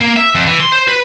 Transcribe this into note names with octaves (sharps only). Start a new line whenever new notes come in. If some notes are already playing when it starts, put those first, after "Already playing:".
A#3
E5
F2
E3
C6
C5
B4